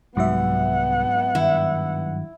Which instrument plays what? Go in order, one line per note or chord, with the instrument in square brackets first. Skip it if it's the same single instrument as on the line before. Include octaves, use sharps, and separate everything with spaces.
[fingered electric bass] C2 G3 [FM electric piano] G#2 F#3 E5 [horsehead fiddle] B3 F#5
[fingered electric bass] G2 D#3 [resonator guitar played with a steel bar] E4